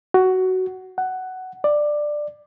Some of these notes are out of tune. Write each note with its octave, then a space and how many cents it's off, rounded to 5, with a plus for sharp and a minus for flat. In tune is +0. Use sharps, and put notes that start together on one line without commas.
F#4 +10
F#5 +10
D5 +15